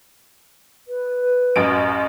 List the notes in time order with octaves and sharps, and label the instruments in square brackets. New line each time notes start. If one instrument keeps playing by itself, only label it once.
[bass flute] B4
[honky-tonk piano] A1 F#2 D7